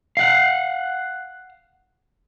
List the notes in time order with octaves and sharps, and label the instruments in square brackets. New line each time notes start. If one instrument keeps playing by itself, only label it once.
[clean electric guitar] F5 F#5